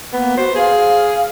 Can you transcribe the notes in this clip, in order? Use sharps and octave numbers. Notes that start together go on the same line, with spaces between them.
A#3 B3
F#4 C5
G#4 F5